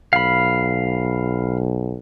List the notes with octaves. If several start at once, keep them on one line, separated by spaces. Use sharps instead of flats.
B1 F5 B5